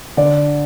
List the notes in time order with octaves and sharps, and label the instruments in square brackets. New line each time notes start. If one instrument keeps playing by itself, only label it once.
[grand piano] D3 D5